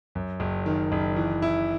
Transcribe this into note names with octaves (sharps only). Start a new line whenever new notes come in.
F#2
F#1
D#3
F#1
E3
E4